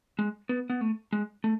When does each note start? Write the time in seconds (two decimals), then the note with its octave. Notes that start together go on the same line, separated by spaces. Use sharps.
0.19 G#3
0.49 B3
0.70 B3
0.81 A3
1.13 G#3
1.44 A3